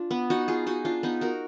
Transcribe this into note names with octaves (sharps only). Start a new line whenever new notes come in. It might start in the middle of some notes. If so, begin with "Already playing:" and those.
Already playing: D4 F4
B3
D#4 F#4
F4 G#4
D#4 F#4
D4 F4
B3 D#4
F#4 A#4